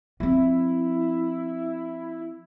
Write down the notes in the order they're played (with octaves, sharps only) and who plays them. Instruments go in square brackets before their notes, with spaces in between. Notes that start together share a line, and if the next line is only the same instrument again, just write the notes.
[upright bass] F3 C4 [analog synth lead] E4